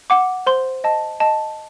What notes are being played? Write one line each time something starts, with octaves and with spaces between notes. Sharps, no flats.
F#5 D6
C5 C6
D#5 A5
D#5 A5